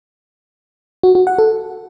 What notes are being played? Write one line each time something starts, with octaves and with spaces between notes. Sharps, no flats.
F#4
F#4
F#5
A4